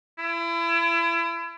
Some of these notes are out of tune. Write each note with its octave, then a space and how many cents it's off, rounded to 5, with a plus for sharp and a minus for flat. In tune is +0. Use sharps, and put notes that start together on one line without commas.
E4 +35